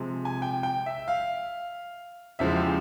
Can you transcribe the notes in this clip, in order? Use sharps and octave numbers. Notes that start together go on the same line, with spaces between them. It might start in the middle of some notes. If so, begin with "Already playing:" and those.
Already playing: C3 F3 G#3
G#5
G5
G5
E5
F5
E2 C#3 F3 G#3 E5
G4